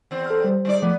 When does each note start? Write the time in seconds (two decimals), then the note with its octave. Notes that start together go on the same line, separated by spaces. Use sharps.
0.11 E2 C4
0.26 A4 F6
0.44 G3 C5
0.65 G#3 D#4 D5
0.82 F3 A3 B3 D6